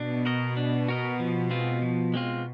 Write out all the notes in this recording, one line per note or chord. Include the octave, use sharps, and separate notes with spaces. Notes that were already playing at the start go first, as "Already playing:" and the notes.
Already playing: B2 D4
F#4 A#4 D#5
D4
F#4 A#4 D#5
F3
G#3 C4 F4
F3
G#3 C4 F4